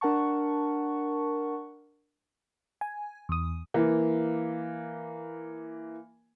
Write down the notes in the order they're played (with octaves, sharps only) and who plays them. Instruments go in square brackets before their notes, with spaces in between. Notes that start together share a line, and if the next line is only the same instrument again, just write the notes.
[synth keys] D4 A#4 F#5 A5 C#6
[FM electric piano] G#5
E2 D#6
[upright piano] E3 A#3